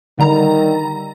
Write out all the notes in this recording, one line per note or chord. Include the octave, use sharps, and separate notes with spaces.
D3 D#3 G3 A#5